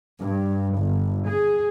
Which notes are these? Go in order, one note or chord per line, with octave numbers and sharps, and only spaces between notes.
G2
G1
G#4